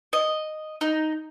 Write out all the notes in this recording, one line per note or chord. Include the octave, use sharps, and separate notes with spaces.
D#5
D#4